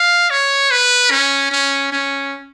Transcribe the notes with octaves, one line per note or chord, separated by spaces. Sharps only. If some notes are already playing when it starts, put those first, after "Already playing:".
Already playing: F5
C#5
B4
C#4
C#4
C#4